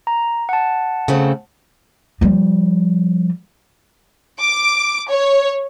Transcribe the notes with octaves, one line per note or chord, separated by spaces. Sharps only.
A#5
F#5 A5
C#3 A3 C4
F3 G3
D6
C#5